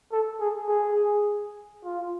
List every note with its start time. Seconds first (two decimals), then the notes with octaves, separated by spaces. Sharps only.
0.12 A4
0.40 G#4
0.69 G#4
1.84 F4